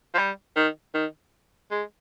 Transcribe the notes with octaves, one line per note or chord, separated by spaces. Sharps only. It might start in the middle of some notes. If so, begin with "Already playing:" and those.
F3
G3
D#3
D#3
G#3